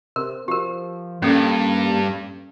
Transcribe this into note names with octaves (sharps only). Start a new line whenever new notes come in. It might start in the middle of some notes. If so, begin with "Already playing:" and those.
C3 A#4
F3 G4 A#4
G2 A#3 C#4 A4